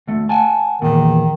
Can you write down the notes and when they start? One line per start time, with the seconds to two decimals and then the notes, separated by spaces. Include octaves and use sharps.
0.08 D2 A3
0.29 F#5 G#5 A5
0.82 E2 A#2 D#3